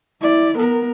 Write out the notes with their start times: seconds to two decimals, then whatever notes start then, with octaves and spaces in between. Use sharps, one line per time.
0.21 E4 D5
0.57 B3 A#4